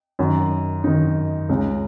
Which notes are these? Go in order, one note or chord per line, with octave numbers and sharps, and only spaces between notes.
F#2 D#3
F#2 D#3 D#4
C#2 C#3